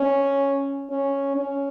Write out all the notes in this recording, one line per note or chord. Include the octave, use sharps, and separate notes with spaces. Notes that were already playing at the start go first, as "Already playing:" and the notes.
Already playing: C#4
C#4
C#4